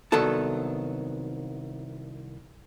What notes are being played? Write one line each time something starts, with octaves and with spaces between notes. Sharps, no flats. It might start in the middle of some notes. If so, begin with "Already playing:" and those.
C2 D#3 F#3 B3 A4 A5